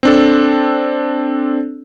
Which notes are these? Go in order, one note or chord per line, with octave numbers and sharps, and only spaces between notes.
C4 D4 A4